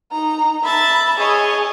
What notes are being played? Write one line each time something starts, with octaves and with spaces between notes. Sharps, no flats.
D#4 A#5
E5 A5 B5
G#4 C#5 D#5